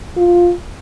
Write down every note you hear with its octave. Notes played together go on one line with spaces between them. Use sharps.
F4